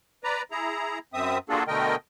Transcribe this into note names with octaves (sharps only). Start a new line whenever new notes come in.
B4 D5 A#5
E4 G#4 A#5
F#2 C4 E5 D#6
A#3 D4 F4 F#4 G#4 A4
B2 D3 A3 A#4 D#5 G5